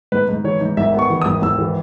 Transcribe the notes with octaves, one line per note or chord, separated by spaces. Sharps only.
G#2 B4
G#2
E3 C#5
G#2
G#1 E5
B3
C#6
E3
D#6
G#1
G#1 E6
E3